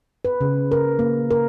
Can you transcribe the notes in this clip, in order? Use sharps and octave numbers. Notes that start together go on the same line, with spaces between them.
B4
C#3
A#4
A#3
A#4